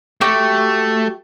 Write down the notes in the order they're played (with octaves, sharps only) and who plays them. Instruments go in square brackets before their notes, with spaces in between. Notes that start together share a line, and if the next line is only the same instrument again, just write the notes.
[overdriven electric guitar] A3 [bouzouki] F#4 G4 G5